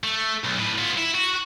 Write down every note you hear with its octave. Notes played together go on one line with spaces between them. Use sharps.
A3
B1
A2 B4
B3 F4
E4
F#4